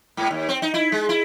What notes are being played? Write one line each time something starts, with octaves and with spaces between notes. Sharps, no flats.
G#2
D#2
C4
D#4
E4
G#3
E4